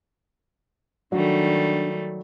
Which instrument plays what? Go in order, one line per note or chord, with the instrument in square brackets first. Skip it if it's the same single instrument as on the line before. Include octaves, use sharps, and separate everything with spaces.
[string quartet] D#3 G3 A3 [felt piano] F#3 [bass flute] D4